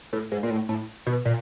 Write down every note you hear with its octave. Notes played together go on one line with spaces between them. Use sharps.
A2
G#2
A#2
A2
A2
B2
A#2